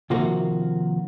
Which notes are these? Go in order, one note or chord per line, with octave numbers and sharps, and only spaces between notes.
C3 D#3 F3 A#3 F4 F#4